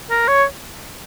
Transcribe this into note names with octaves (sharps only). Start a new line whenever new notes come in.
A#4
C#5